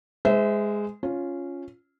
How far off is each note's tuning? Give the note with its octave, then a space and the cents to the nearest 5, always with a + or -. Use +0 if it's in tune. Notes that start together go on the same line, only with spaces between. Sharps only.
G#3 +0 C5 -35 E5 -15
C#4 +0 F4 +0